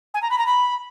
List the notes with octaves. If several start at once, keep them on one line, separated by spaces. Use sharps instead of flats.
G#5
A#5
B5
A#5
B5